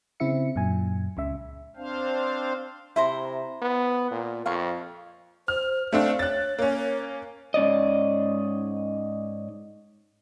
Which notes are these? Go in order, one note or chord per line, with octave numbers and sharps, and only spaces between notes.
C#3 C4 E4 E5 C#7
F#2 A#2 G#5
C#2 C#3 E5
C4 D4 C5 F5
C3 E4 C5 A#5
B3
A#2
F2 F5 C#6
C5 F6
A3 C4 D4 F5
C#5 F#6 A6
A#3 C#4 C#5
G#2 C#4 D5 D#5